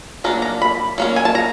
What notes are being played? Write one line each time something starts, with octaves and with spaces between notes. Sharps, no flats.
F#3 A#3 D4 A#5
A#5
B5
F#3 A#3 C#4
G#5
A5
A#5